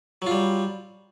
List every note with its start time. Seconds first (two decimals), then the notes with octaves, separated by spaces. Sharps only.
0.22 F#3
0.27 F4
0.31 G3